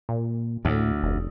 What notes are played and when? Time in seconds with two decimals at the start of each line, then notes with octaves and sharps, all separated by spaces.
0.09 A#2
0.65 D2 A2
1.02 F1